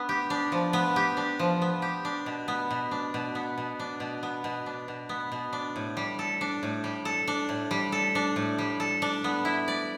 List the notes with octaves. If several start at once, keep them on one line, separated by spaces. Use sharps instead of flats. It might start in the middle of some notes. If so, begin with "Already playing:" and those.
Already playing: B3 D4
G4
D4
F3
B3
G4
D4
F3
B3
G4
D4
B2
B3
B2
D4
B2
B3
B2
D4
B2
B3
B2
D4
B2
B3
B2
D4
A2
G3
A4
D4
A2
G3
A4
D4
A2
G3
A4
D4
A2
G3
A4
D4
B3
E4
D5